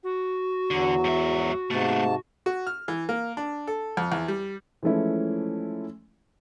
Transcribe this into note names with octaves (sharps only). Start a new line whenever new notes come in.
F#4
E2 D3 F#3
G#2 E5
G#2 C3 A3 B3 A5
F#4
F6
E3
A#3
D4
A4
F2
E2
G3
E3 F3 G#3 A3 C#4 E4